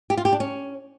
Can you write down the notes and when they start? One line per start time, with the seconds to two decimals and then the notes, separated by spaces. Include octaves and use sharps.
0.10 G4
0.17 F4
0.25 G4
0.33 D4
0.40 C#4